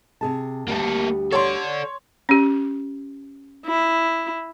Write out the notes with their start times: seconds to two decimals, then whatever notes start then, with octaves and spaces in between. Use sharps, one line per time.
0.21 C3 G#4 A5
0.68 D2 G3 A#3 B3 G4 A4
1.32 A4 C#5 D5 C6
2.29 C#4 G4
3.66 E4